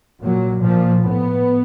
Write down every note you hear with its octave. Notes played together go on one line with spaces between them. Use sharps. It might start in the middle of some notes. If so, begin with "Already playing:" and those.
A#2 F#3
A#2 F3
A2 B3